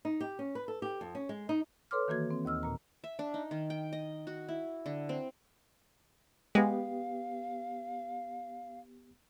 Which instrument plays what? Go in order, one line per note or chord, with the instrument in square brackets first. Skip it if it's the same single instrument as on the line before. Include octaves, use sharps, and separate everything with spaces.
[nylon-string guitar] D#4
G4
C#4
B4
A4
G4
F2
C#4
G#3
D#4
[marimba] A4 B4 C#5 C6 D6 F6
D#3 E3 A#3 F#4 G#6
C4
D#2 D#5 E6 F6
A#2 A#5
[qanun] E5
D4
D#4
D#3
G5
D#5
F#4
E4
D3
C4
[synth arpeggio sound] G#3 [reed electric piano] B3 G4 [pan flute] F5